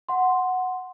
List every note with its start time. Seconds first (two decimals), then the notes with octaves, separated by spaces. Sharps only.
0.09 F#5 C6